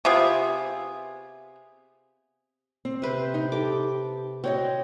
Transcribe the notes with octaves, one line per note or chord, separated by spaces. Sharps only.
C3 B3 F4 G#4
C4
C3 B4 C5
D#4
G4 A4 D6
C4 F#4 C#5 D#5